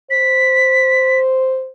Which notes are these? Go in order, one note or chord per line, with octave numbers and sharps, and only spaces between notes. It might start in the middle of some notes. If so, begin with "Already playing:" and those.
C5 B6